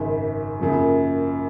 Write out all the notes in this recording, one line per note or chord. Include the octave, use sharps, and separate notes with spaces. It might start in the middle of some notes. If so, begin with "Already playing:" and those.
Already playing: G#1 F#2 C#3
F#2 C#3 F3 A#3